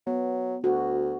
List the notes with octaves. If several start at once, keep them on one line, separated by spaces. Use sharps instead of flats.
F#3 B3
D2 F#4